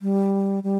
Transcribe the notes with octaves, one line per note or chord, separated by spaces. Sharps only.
G3
G3